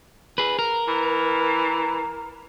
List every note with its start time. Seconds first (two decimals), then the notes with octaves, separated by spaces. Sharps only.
0.38 G#4 B4
0.59 A#4
0.88 E3